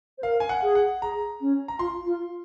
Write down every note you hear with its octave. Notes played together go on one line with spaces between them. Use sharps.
C5
A#4 F5
G#5
F#5
G#4
F#5
G#4 A#5
C#4
A#5
F4 C6
F4